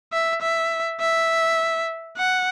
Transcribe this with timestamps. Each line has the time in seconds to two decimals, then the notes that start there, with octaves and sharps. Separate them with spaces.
0.13 E5
0.42 E5
1.00 E5
2.18 F#5